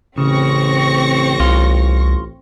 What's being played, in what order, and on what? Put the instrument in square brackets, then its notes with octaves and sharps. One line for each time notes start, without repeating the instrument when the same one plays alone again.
[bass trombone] A1 [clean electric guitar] C#3 [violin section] C4 C#6 A#6
[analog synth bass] C2 [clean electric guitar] F4